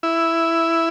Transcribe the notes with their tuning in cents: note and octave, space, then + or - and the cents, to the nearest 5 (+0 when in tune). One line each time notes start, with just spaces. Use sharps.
E4 +5